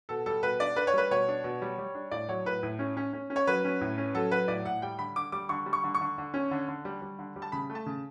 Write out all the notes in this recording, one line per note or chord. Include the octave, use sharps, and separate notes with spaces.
B2 A4
G3 A4
B2 B4
D4 D5
D4 B4
C#5
G3 B4
B2 C#5
D4
B2
G3
G3
D4
A2 D5
F#3 C#5
A2 B4
A2
C#4
C#4
C#4
C#4
C#5
F#3 B4
C#4
A2
C#4
F#3 A4
F#3 B4
A2 D5
A2 F#5
G3 G5
D3 B5
D3 D6
G3 D6
D3 C#6
G3
C#6
D3
C#6
D3
D3
C#4
D3
D3
G3
G3
D3
G3
A5
C#3 B5
A3
A5
C#3